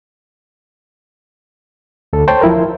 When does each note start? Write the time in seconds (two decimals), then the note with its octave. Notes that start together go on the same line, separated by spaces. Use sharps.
2.13 D2 A4
2.28 C5 C#5 G5 A5 C6
2.41 F3 E4 A#4